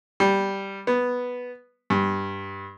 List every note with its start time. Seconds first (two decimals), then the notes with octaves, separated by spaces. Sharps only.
0.20 G3
0.87 B3
1.90 G2